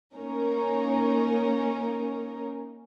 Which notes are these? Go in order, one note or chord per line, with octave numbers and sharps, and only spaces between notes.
A#3 C#4 D#4 A#4